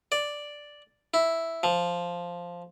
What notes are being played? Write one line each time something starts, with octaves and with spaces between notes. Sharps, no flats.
D5
E4
F3